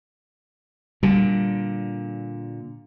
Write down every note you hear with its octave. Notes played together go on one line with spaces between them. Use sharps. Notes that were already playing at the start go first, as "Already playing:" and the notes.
A#2 D3 G3